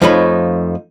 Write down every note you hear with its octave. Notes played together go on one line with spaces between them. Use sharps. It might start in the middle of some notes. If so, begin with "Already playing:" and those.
F2 F3 A3 D#4 C#5 B5